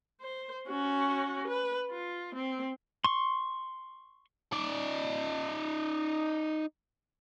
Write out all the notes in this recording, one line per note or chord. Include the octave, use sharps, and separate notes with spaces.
C5
C#4 F#4
B4
F4
C4
C6 C#6
D#4 D5